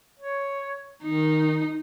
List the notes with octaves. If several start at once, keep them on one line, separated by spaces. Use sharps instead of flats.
C#5
D#3 D#4